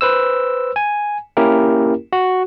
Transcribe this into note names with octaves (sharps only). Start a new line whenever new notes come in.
B4 C5 E6
G#5
A#3 C#4 E4 G4 A#4
F#4